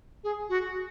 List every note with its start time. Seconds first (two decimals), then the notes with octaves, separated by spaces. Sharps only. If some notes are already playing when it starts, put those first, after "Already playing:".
0.24 G#4
0.49 F#4